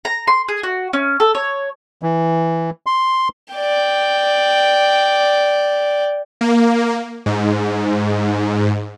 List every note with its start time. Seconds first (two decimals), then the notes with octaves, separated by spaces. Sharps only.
0.05 A#5
0.27 C6
0.48 G#4
0.63 F#4
0.93 C#4
1.20 A4
1.35 C#5
2.03 E3
2.86 C6
3.54 D5 G5
6.41 A#3
7.26 G#2